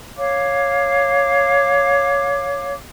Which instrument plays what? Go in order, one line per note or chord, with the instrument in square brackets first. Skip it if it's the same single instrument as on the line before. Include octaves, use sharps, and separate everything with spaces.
[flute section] C#5 F5 D6